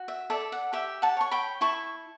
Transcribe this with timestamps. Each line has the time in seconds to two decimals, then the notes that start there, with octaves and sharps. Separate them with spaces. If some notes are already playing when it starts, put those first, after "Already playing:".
Already playing: F#4
0.08 E5
0.30 A4 D5 E5
0.52 F#5
0.73 G4 E5 G5
1.02 F#5 A5
1.17 C#5 C#6
1.31 G5 B5
1.61 E4 A5 C#6